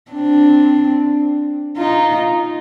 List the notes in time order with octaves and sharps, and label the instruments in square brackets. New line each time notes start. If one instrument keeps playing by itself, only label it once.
[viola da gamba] C4 D4
D#4 F4